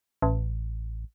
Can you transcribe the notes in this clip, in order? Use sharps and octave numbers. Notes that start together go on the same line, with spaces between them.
A1